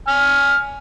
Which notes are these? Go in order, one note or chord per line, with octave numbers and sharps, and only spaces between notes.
G#5 F6